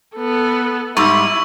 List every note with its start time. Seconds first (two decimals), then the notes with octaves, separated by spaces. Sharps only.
0.15 B3 A4
0.97 G#2 G3 E4 C#6 E6